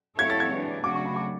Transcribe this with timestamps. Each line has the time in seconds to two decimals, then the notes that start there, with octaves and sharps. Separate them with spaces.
0.18 A3 E4 A4 C#5 G#6
0.30 A6
0.40 G#6
0.51 E3 G#3 D4
0.84 C#3 F#3 A3 D4 F#4 D6
0.95 C#6
1.05 B5
1.16 D6